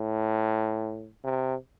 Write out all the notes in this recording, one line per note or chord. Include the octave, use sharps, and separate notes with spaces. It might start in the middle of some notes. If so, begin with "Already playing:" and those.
Already playing: A2
C3